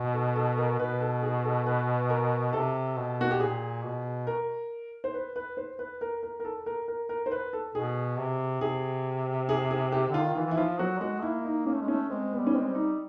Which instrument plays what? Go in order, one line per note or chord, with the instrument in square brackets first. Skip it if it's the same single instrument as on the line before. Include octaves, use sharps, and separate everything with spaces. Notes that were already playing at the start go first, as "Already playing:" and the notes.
Already playing: [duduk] B2
[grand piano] A4
A4
A#4
[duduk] B2 [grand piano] B4
[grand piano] A4
G#4
A4
B4
A#4
[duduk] C3 [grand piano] A4
[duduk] B2
[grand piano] F#4
G4
[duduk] A#2 [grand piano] G#4
[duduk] B2
[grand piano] A#4
C5
B4
B4
C5
B4
A#4
A#4
A#4
A4
A#4
A#4
A#4
C5
B4
A4
[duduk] B2 [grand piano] G#4
[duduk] C3
[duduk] C3 [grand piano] G#4
[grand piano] G#4
G#4
G4
[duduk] D3 [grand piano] F4
[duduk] D#3
[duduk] E3 [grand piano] F4
[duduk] E3 [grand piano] E4
[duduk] F3 [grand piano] F4
[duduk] F#3 [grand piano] F#4
[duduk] G#3 [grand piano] F#4
[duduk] A#3 [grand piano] E4
[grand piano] D#4
[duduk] A#3 [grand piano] C#4
[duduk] A3
G#3
[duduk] A3 [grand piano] C#4
[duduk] G#3 [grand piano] C4
[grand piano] B3
[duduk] G3
[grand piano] C#4
[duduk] G#3 [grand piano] C4
[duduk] G3
[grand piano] D#4